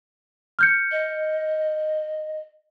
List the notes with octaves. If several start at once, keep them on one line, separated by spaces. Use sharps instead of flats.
F6 G6 C#7
D#5